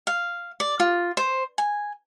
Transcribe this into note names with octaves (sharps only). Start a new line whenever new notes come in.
F5
D5
F4
C5
G#5